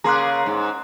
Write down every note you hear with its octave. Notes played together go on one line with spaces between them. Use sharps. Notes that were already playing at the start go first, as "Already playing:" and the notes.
C#3 A#3 G#4 A#5 C6 F#6
G#2